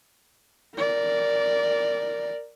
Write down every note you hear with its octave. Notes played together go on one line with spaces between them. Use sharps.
A#4 D5